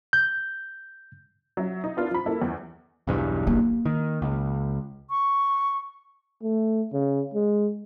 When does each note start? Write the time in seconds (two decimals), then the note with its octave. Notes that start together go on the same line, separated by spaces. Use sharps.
0.13 G6
1.57 F#3 E5
1.84 D#4
1.97 B3 D4 E4 F4 A#4
2.11 F3 B5
2.26 A#3 E4 A4
2.42 E2
3.07 B1 E2 G2
3.47 A#3
3.86 D#3
4.22 C#2
5.10 C#6
6.43 A3
6.92 C#3
7.34 G#3